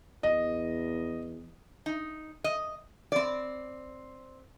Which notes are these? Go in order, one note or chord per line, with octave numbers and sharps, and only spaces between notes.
E2 D#5
D#4
D#5
C4 D5